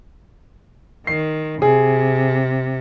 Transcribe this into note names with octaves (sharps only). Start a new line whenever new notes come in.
D#3 C7
C3 G#4